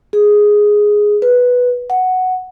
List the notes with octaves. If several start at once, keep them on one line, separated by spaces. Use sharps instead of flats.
G#4
B4
F#5